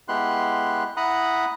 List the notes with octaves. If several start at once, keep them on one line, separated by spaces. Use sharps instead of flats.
G#3 B3 E4 G4 C6 F#6
E4 F#5 A#5 B5 D#6 F#6